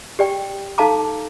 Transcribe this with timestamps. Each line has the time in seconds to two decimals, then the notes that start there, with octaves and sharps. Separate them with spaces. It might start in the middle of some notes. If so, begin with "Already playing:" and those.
0.19 G4 D5 G5
0.78 D#4 A4 F5 A5 A#5 D6